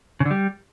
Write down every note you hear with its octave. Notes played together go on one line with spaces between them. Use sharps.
C#3
D3
G3